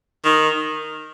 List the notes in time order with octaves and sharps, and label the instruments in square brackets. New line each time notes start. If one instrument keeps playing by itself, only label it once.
[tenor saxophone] D#3